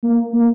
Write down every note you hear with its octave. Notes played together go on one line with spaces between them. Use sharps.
A#3
A#3